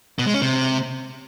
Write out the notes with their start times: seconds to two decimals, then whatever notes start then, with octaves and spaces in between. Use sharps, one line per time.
0.19 B2
0.26 G#3
0.34 C#4
0.42 C3